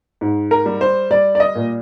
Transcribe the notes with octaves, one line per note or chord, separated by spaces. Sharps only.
G#2
A#4
G3
C5
G3 D5
D5
D#5
A#2